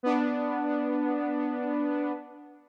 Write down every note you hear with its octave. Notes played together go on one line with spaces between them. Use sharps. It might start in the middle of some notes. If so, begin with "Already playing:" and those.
B3 D4